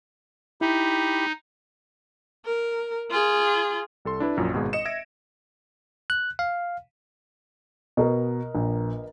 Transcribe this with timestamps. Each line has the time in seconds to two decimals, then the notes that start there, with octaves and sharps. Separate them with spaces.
0.61 D#4 E4 G4 B5
2.45 A#4
3.11 F4 G#4
4.05 C2 A4 C6
4.20 D4 E4 B4 D5
4.37 A#1 F#2 F4
4.54 G#1 B2 G#3 G#4
4.73 D#5 C#7 E7
4.85 E5 G#6 A#6 D7
6.10 F#6
6.39 F5
7.97 B2 A#4 B4 D#5
8.55 A#1